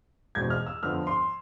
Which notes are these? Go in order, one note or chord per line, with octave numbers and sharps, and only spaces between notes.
E2 B2 G#3 C4 G#6
F6
E6
F2 D3 F3 B3 F6
C6